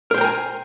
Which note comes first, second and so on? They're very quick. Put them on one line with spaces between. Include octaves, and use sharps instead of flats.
A#4 C5 G5 A#5 G#5